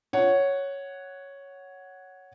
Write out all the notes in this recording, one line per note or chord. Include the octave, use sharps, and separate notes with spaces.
C#5 F#5